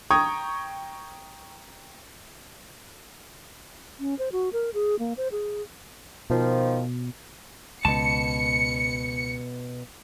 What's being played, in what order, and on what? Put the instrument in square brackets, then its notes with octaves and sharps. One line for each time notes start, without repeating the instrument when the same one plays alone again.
[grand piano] G5 A#5 C#6 D#6 G#6
[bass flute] C#4
C5
F#4
A#4
G#4
A#3
C5
G#4
[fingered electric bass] B2 [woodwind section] D#3 F3
[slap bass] C#2 [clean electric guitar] B2 A5 [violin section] C#7